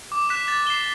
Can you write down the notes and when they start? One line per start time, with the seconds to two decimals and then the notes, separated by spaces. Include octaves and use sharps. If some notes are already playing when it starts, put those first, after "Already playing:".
0.12 D6
0.29 F#6 B6 E7
0.48 A6
0.67 C7 E7 G7